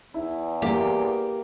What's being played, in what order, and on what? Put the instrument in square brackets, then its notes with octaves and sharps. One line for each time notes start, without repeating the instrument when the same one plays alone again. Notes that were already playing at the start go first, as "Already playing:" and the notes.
[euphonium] E2 [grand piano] E4
[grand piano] A#3 [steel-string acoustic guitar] G4 G5